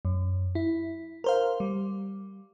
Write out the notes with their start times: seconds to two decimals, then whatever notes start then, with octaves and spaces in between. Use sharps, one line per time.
0.05 F#2
0.55 E4
1.24 A#4 C5 F5
1.60 G3